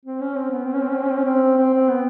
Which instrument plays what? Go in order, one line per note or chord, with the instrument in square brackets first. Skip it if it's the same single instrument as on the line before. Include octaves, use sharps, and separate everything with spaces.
[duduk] C4
C#4
C4
B3
C4
C#4
C4
C#4
C4
C#4
C4
C#4
C4
C4
C4
B3